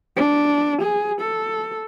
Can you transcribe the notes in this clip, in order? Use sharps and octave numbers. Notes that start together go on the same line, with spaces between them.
D4
G#4
A4